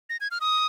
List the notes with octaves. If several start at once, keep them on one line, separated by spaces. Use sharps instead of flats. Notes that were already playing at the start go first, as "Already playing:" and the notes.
A#6
G#6
F6
D#6